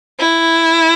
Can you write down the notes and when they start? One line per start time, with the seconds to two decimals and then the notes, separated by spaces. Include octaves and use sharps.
0.19 E4